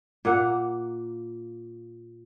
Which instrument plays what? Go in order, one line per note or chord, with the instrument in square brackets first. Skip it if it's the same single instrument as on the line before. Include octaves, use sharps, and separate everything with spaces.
[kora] A#2 A#3 F#5